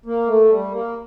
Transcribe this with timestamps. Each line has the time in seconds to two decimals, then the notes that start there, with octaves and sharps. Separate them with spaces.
0.06 A#3
0.27 A3
0.49 G3
0.71 A#3